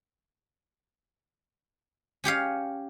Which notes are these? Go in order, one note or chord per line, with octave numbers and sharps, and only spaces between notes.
C#4 G4 C#5 F5